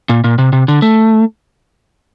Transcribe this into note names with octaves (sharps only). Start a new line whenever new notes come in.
A#2
A#2
C3
C3
D3
A3